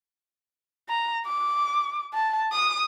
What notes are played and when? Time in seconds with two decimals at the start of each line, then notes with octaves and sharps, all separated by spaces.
0.89 A#5
1.27 D6
2.14 A5
2.52 D#6